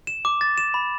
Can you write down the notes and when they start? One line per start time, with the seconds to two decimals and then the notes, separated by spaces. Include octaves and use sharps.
0.07 E7
0.25 D6
0.41 A6
0.58 E7
0.74 B5